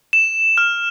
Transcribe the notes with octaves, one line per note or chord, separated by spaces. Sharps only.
E7
F6